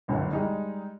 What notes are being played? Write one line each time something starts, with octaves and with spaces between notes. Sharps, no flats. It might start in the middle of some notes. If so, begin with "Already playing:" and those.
G1 C#2 F#2 B2 D3
G3 G#3 D#4